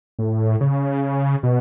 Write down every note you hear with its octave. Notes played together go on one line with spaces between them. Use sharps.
A2
C#3
B2